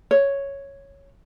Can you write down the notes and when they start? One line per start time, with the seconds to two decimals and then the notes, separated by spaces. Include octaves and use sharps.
0.11 C#5